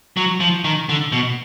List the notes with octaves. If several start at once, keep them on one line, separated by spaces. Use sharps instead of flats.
F#3
F3
D#3
D3
B2